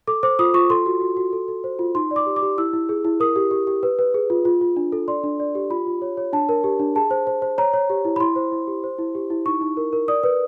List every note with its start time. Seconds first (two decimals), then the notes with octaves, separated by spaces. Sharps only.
0.07 A4 D6
0.23 C5 D6
0.39 F4 D#6
0.54 F4 C#6
0.70 A4 C6
0.86 F#4
1.01 F#4
1.17 F#4
1.33 A4
1.48 A4
1.64 C5
1.79 F4
1.95 D#4 C6
2.11 D5
2.16 D6
2.26 G4
2.36 D6
2.42 G4
2.58 E4 E6
2.73 E4
2.89 G#4
3.05 E4
3.20 A#4 D#6
3.36 G4
3.51 G4
3.67 G4
3.83 B4
3.99 B4
4.14 G#4
4.30 F4
4.45 F4
4.61 F4
4.76 D4
4.92 A4
5.08 D5 C6
5.24 D4
5.40 D5
5.55 G4
5.70 F4 B5
5.87 F4
6.02 C#5
6.17 C#5
6.33 D4 A5
6.49 A#4
6.64 G4
6.79 D4
6.95 G#4 A5
7.11 C5
7.27 C5
7.42 C5
7.58 C#5 A#5
7.73 C#5
7.90 G4
8.05 E4
8.16 B5
8.20 E4 C6
8.36 C5
8.52 E4
8.68 G4
8.84 C5
8.99 E4
9.15 G4
9.30 E4
9.46 D#4 C#6
9.61 D#4
9.77 A#4
9.93 A#4
10.08 D5 D#6
10.23 B4